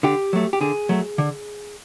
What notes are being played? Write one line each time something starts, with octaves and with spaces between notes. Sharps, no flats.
D3 G4
F#3 A3
G4
D3 G#4
F#3 A3
D3